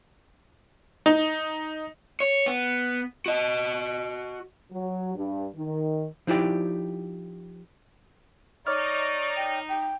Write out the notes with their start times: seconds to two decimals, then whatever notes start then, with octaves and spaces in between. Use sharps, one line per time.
1.06 D#4
2.20 C#5
2.46 B3
3.26 F#4 D#5
4.72 F#3
5.15 G2
5.56 D#3
6.27 F3 D#4 E4 G4 D5
8.67 D#4 C#5 D5 C#6 D6 F6
9.36 G5
9.69 G5